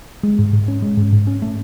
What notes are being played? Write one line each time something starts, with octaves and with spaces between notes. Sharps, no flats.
G#3
G#2
G#2
C#4
G#3
G#2
G#2
C#4
A3